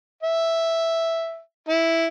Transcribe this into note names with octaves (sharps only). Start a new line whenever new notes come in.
E5
E4